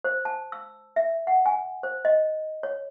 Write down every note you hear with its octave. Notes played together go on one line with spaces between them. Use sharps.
C5
A5
E6
E5
F#5
G#5
C5
D#5
C#5